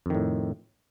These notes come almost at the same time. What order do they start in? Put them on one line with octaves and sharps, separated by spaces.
F2 D#3 A2